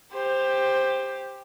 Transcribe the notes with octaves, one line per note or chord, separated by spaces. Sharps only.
G4 C5